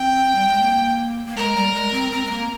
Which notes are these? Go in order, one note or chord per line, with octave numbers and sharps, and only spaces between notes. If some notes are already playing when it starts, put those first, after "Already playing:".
Already playing: C4 G5
G3
G#3
A#3
A#3
G#3 A#4
G3
G#3
C4
C4
G#3
A#3